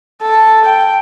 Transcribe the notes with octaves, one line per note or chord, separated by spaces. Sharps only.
A4
G5